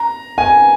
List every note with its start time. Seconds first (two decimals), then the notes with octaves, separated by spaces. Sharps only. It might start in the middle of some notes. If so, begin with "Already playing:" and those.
Already playing: A#5
0.38 G#5